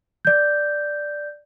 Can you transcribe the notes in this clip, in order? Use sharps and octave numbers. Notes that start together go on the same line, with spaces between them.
D5 G6